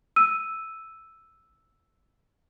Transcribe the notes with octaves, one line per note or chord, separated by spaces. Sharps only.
E6 D#7